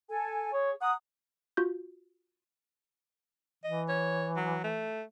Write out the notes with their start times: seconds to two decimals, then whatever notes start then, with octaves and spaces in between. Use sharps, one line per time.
0.09 A4 G#5
0.53 G#4 C#5
0.81 F#5 A#5 D#6
1.57 F4 F#4 G6
3.64 E3 D#5
3.89 C#5
4.36 F#3
4.64 A3